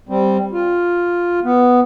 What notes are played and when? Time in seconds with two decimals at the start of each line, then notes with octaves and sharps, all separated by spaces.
0.09 G3 C4
0.53 F4
1.44 B3